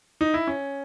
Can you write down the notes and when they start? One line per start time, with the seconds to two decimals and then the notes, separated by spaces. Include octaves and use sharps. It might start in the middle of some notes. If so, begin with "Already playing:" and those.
0.21 D#4
0.34 E4
0.47 C#4